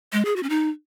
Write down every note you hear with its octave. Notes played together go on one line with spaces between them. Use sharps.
G#3
G#4
F#4
C#4
D#4